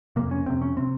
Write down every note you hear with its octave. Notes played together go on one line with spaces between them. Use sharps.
F2 C3 A#3
C#4
F2 C3 C4
C#4
C3 C4